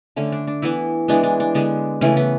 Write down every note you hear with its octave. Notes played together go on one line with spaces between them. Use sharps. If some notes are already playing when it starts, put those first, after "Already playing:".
D3 A3 C#4
D4
D4
E3 B3 E4
E3 G#3 B3 D4
D4
D4
D3 G#3 B3 D4
C#3 E3 A3 C#4
B3